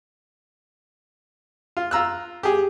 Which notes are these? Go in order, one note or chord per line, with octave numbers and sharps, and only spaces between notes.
F4
F4 A#5 E6 F#6
G4 G#4